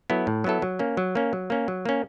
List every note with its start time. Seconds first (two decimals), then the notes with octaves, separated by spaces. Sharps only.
0.10 F#3 B3 E4 A4
0.27 A2
0.44 F#3 B3 E4 A4
0.62 F#3
0.79 A#3 C#4
0.97 F#3
1.15 A#3 C#4
1.33 F#3
1.50 A#3 C#4
1.68 F#3
1.85 A#3 C#4